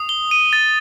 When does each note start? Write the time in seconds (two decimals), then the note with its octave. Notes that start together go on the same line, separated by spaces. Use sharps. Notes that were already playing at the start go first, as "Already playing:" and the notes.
Already playing: D#6
0.09 G7
0.31 D#7
0.53 A6